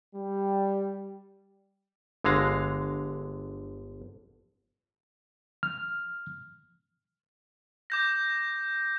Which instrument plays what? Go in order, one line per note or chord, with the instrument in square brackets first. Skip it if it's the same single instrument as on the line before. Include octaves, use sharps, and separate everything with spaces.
[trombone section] G3
[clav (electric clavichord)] G1 D3 G#3 F5 A#5
[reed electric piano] F6
[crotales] D6 G6 A#6